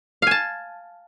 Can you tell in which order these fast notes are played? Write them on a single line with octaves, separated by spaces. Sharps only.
F5 G#5 A5